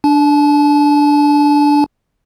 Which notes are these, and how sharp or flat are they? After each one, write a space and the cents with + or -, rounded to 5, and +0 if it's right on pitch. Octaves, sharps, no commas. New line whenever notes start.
D4 +0 A5 -35